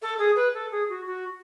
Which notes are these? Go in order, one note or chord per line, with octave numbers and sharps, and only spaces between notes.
A4
G#4
B4
A4
G#4
F#4
F#4